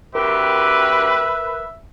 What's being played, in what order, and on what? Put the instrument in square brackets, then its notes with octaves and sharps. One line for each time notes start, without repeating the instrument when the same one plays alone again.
[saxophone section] D2 C4 G4 [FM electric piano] A#4 [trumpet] B4 [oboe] E5